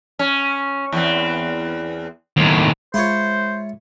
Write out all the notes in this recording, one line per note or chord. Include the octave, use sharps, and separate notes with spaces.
C#4
E2 B3 C4
D#2 A2
G#3 E4 F4 C5 C#5